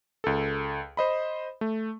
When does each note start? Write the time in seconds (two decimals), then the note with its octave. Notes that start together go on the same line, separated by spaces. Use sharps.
0.24 C#2 A4
0.97 C5 D#5 B5
1.61 A3